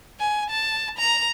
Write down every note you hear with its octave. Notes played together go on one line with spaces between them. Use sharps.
G#5
A5
A#5